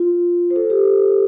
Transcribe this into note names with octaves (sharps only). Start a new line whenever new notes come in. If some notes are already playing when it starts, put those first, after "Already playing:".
Already playing: F4
C5
A4
G4